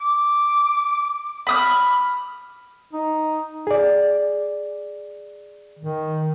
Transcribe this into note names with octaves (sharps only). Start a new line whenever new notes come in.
D6
B5 D#6 F6
D#4
G#4 D5
D#3